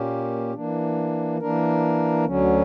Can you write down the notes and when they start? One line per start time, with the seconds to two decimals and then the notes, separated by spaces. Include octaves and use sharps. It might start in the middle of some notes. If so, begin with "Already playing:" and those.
Already playing: A#2 A#3 C#4 G4
0.54 E3 A#3 D4
1.40 E3 A#3 D4 A#4
2.25 D2 D3 F#3 C#4